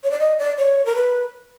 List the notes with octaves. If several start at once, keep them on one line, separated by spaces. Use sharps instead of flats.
C#5
D5
D#5
D5
C#5
A#4
B4